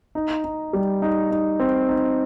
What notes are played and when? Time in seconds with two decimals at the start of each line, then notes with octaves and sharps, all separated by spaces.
0.15 D#4
0.44 D#4
0.73 G3
1.02 D#4
1.31 D#4
1.60 C4
1.89 D#4